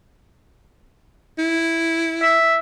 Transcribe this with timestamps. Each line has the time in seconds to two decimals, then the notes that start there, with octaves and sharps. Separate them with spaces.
1.39 E4
2.22 E5